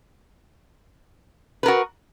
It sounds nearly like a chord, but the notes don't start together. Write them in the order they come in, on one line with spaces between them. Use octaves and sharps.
B4 A#4 F#4